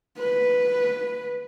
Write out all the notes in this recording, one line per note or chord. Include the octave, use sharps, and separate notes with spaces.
B4